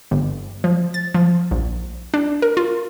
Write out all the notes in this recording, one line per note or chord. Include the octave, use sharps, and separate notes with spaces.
G1
F3
A6
F3
A#1
D4
A#4
F4